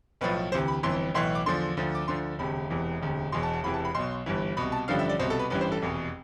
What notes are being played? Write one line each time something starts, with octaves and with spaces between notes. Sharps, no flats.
B1 A2 F3 B4
D2 C3 E3 C5
B5
G1 F2 E3 C6
B1 A2 E3 C6
D6
E2 D3 F3 C6
D2 D3 F3
D6
D2 D3 F3 C6
E1 D2 C3 B5
E1 E2 C3 E3
E1 D2 C3
E1 E2 B2 C6
A5
A5
E1 E2 C3 E3 B5
A5
B5
B1 B2 C6
G1 G2 E3
C2 B2 B5
A5
A1 G2 D3 F3 F5
E5
D5
C2 B2 C5
A4
B4
A1 G2 E3 B4
C5
A4
F1 E2 B2